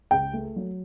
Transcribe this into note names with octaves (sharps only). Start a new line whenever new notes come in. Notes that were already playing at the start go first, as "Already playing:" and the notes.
C#2 G5
A3
F#3